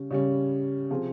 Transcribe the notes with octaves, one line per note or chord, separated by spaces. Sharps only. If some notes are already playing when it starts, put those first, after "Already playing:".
Already playing: C#3 G3 C#4
C#3 G3 C#4
C3 F3 C4 F4 G#4